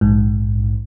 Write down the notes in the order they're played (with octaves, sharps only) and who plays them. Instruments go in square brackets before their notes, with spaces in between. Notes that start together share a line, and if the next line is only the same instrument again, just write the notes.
[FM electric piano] A#1 G#2